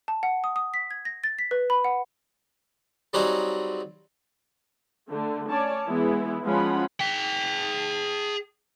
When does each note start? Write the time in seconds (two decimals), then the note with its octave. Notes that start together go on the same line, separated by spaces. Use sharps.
0.08 A5
0.23 F#5
0.44 D#6
0.56 D#6
0.74 B6
0.91 G#6
1.05 A#6
1.24 A6
1.39 B6
1.51 B4
1.70 B5
1.85 F#5
3.13 F#3 G3 C4 D#4 F#4 G#4
5.10 D3 A3
5.50 C#4 C#5 D5 A5
5.87 E3 G#3 B3 E4
6.43 F3 G#3 C#4 F4 F#5 B5
7.00 G#4 G5